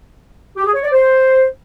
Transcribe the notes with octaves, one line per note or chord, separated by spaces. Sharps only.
G4
G#4
C#5
D5
C5